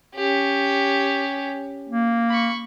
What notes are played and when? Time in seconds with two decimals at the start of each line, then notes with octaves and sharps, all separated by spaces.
0.15 C#4 G4
1.89 A#3
2.30 B5 C#6